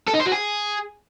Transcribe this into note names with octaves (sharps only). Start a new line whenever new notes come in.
A4
D#4
C5
F#4
G#4